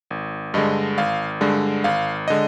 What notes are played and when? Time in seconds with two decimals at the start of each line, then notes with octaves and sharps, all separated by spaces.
0.10 G#1
0.54 G2 D3 G#3 D#5
0.98 G#1 F5
1.41 G2 D3 G#3
1.84 G#1 F5
2.28 D3 G#3 D#5